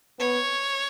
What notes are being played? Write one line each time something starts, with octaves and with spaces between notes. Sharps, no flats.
B3 C#5